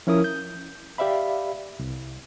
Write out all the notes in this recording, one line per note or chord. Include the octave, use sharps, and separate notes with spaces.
F3 C#4 E4 A#4 D#6
G6
G4 D5 E5 F5 B5
C2